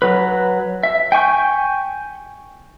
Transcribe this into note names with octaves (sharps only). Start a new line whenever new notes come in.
F#3 B4
E5
G5 G#5 C#6 G6